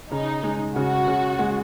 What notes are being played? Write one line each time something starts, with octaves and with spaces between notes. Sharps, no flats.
C#3 D#4
G#3
C#3 F#4
C#3
G#3